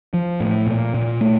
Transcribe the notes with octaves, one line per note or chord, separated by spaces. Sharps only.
F3
A2
A#2
A#2
A3